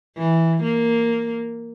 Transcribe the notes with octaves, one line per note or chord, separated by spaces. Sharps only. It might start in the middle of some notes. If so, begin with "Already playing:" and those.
E3
A#3